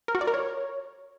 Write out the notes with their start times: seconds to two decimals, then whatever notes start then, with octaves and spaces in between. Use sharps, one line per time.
0.08 A#4
0.15 F#4
0.21 D5
0.27 A#4
0.34 C#5